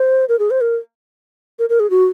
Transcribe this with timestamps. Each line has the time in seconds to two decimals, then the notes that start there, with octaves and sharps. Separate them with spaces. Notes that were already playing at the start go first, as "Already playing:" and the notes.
Already playing: C5
0.29 A#4
0.39 G#4
0.51 C5
0.61 A#4
1.59 A#4
1.69 A#4
1.80 G#4
1.90 F#4